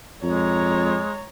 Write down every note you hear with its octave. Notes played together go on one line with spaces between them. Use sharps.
F2 G#3 C#5 A#5